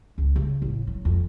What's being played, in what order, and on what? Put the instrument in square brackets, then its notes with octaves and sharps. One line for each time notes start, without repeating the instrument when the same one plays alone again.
[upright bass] C#2
C#3
A1
F#3
F2